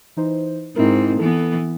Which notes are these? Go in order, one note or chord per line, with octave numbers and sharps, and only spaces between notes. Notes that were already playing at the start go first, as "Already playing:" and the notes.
E3 D#4 C5
G#2 C4 D#4 E4 A#4
E3 B3 A4